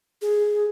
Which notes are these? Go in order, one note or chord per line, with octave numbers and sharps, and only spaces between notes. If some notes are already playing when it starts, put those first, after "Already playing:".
G#4